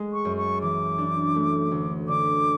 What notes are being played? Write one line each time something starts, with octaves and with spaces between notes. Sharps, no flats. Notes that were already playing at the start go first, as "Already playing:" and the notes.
Already playing: G#3
C#6
F#2
C#6
E3 D6
D4
A3
D2
D3 D6